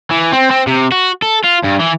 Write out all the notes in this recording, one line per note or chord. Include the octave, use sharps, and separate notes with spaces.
E3
C4
C4
C3
F#4
A4
F4
G2
E3